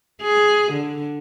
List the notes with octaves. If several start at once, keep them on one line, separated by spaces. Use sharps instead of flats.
G#4
D3